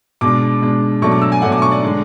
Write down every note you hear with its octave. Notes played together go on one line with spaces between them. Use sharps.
B2 G#3 D4 D6
B2 G#3 D4
B2 F#3 A3 D4 C#6
D6
E6
G#5
B2 F#3 A3 D4 F#5
D6
C#6
D5
D3 G#3 D4